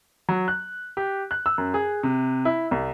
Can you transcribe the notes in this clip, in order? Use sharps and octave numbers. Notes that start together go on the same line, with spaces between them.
F#3
F#6
G4
F#6
E6
F#2
G#4
C3
E4
C2